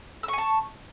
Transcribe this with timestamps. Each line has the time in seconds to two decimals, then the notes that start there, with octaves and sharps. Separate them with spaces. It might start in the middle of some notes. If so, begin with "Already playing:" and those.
0.23 E6
0.28 C#6
0.33 G#5
0.38 A5